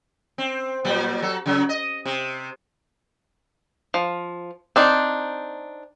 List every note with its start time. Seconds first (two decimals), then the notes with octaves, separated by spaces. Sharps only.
0.38 C4
0.85 A#2 F#3 G3
1.22 F#3 A4
1.46 C#3 F#3
1.69 D#5
2.06 C3
3.94 F3
4.76 C4 D4 D#4